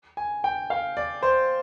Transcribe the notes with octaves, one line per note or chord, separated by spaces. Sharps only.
G#5
G5
F5
D5
C5